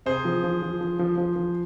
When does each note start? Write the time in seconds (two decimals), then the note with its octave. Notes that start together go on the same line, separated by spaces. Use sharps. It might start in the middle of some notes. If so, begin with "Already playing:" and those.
0.06 C3 G#4 C5
0.25 F3
0.44 F3
0.63 F3
0.81 F3
0.99 F3
1.18 F3
1.36 F3